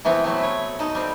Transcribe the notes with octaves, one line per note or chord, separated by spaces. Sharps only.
E3 A3 B3 C4
F#3 A3
B4 C#5
D#4 A4
G3 C4